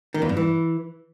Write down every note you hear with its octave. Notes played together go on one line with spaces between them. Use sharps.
D#3
E2
G2
E3